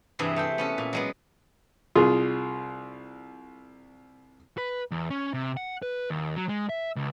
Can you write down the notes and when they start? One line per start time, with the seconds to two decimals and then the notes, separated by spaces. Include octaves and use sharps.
0.19 G2 C3 E3 G3 G#4 E5
0.36 A3 C5 G5
0.58 B3 C#4 A4
0.78 A#2
0.93 F#3 G#3 B3
1.95 C2 F4 G#4
4.58 B4
4.91 E2
5.10 C#4
5.34 C3
5.57 F#5
5.82 B4
6.10 D#2
6.36 F#3
6.49 G#3
6.69 E5
6.96 C#2